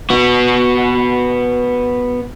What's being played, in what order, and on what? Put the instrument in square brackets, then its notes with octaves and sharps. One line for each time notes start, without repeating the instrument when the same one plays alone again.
[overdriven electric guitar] B3 F#4